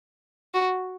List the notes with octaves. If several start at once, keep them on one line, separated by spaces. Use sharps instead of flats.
F#4